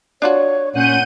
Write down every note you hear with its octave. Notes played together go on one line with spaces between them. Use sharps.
D4 F4 F#4 C#5
A#2 C#4 F#5 G6 D#7